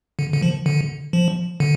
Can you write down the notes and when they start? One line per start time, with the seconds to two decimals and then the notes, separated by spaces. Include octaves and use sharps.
0.19 D3
0.33 D3
0.42 F3
0.66 D3
1.13 F3
1.60 D3